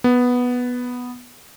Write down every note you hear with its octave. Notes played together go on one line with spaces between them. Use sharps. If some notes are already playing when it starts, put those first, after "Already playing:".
B3